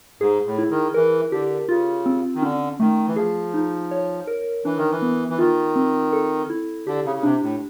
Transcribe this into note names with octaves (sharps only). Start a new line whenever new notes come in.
G#2 G#4
A2
E4
D#3
E3 A#4
D3 G4
C#3 F4
C4
D#3
D3 C#4
D#3 A3
E3
F3 G#4
D#4
C#5
A#4
E3 D4
D#3
E3
B3
E3
D#3 F4
C4
A4
E4
D3 G4
C#3
C#3
C3 D4
A2